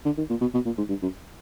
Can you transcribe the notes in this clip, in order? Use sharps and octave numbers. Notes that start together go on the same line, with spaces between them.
D3
D#3
A#2
B2
B2
A#2
G#2
G2
F#2